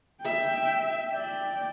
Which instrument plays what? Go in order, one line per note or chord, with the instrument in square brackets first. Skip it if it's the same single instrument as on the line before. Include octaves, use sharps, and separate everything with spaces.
[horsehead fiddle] E5 G5
D5 G5